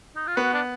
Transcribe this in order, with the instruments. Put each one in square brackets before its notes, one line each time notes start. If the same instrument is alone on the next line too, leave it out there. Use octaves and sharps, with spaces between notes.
[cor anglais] D#4
F4
[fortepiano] B3 [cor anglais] F#4
[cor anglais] D4